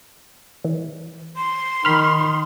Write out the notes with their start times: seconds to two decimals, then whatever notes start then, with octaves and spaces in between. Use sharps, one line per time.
0.64 E3
1.37 C6
1.85 D#3 B5 F6